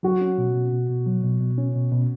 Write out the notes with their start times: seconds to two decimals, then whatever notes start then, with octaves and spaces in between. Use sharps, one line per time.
0.03 F#3 F#4
0.21 C#4
0.38 B2
0.55 B2
0.72 B2
0.89 B2
1.07 F#3
1.24 B2
1.41 B2
1.58 C#4
1.75 B2
1.92 B2